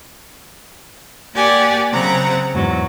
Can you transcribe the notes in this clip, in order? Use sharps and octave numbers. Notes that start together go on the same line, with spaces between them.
A#3 G4 D5 F#5 G#5
C#3 F#3 C4 F#5 A#5
E2 G#2 F#3